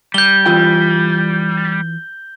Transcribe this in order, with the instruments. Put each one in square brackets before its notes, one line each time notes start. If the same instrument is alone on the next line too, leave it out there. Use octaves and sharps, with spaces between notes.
[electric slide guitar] G3 [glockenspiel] G6 G7
[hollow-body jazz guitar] E3 F4 G5